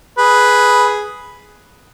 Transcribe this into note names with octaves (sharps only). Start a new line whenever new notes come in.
G#4 B4